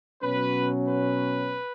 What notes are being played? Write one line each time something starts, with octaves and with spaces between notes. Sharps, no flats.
B2 F#3 C#4 B4
B4